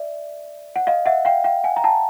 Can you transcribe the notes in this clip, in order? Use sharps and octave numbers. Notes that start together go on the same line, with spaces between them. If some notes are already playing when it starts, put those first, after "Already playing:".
Already playing: D5 E5
F#5
D#5 F5
E5 F#5
F5 G5
F5 G5
F#5 G#5
A#5
G5 A5